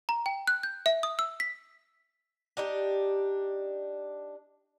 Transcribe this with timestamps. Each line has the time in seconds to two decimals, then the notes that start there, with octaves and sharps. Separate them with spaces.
0.09 A#5
0.26 G5
0.47 F#6
0.63 G6
0.86 E5
1.03 D#6
1.19 E6
1.40 B6
2.57 D4 D#4 G4